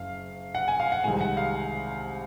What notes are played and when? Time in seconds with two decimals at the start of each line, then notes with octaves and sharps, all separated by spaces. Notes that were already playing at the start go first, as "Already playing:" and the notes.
Already playing: F#1 F5
0.55 F#5
0.68 G#5
0.80 F5
0.92 F#5
1.04 C2 C3 D#3 G#3 G#5
1.21 F#5
1.37 F5